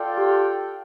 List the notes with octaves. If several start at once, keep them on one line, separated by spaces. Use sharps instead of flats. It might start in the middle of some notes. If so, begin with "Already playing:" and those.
Already playing: F4 A4 D5 G5
G4